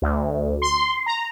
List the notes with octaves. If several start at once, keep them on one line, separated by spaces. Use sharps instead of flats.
D2
C6
A#5